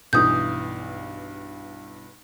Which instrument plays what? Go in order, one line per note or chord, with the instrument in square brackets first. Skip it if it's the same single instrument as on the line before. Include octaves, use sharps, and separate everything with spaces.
[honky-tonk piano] B1 G2 E3 [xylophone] D#6 G6